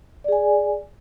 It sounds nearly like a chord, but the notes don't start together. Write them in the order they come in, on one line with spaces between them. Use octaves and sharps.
D5 G#4 G#5